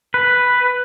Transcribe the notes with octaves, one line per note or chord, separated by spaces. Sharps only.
B4